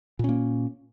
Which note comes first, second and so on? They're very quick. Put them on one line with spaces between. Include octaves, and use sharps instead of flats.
A#2 C#4 A#3